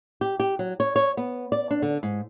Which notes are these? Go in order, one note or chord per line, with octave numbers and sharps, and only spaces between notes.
G4
G4
F#3
C#5
C#5
B3
D5
D4
D3
G#2